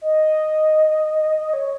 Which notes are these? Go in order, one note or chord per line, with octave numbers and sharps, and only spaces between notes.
D#5
C#5